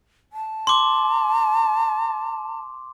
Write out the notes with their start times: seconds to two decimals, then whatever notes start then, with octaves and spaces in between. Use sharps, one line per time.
0.33 A5
0.67 C6 D6